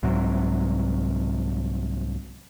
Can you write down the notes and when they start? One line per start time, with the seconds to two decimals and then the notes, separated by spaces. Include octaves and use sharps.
0.03 C2 G#2 C3 F#3